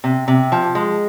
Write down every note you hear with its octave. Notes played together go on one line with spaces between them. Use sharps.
C3
C3
F3
G#3